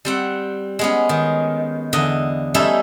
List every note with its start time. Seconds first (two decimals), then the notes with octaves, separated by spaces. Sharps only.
0.05 G3 C4 F#5
0.79 G#3 B3 C#4
1.09 D#3
1.93 E2 D3 D#5
2.54 G3 A3 C#4 D#4 E4 E5